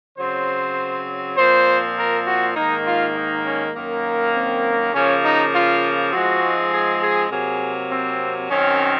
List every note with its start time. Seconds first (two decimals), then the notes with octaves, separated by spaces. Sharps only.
0.18 C#3 F#3 C4 C5
1.37 A#2 F3 C4 C5
1.97 A#4
2.26 F#4
2.56 G#2 D#3 A#3 D#4
2.85 F4
3.16 D#4
3.45 C#4
3.75 F#2 D#3 A#3
4.34 C4
4.93 C#3 F3 A#3 C#4
5.24 D#4
5.53 F4
6.13 G#2 F3 G#3 C4 F#4
6.72 G#4
7.02 G#4
7.31 C3 F#3 A#3 G#4
7.91 C4
8.50 F#2 D#3 F#3 C4 C#4